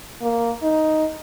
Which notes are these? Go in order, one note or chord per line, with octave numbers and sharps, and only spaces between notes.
A#3
D#4